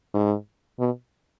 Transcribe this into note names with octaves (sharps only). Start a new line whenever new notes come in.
G#2
B2